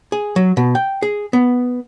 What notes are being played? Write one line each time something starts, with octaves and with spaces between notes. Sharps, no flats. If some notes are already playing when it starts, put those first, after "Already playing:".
G#4
F#3
B2
G5
G#4
B3